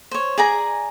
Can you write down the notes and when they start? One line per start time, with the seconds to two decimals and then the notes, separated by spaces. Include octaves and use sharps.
0.11 C5 C#5
0.38 G#4 D5 G#5 A#5